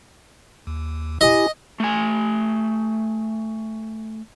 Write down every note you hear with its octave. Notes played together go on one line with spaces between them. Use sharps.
D#2
E4 G4 D#5 G#5
A3 G#5